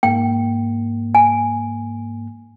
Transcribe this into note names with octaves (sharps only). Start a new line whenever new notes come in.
G#2 A#3 G5
G#5